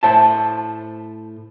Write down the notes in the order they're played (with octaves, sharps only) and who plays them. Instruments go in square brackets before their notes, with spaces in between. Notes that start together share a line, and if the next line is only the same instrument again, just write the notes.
[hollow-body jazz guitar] A2 C5 E5 A5